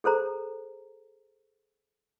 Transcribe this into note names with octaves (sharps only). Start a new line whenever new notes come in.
G#4 A4 C5 A#5